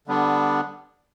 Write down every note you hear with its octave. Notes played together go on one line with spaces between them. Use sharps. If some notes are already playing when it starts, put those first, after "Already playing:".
D3 G3 B3 D4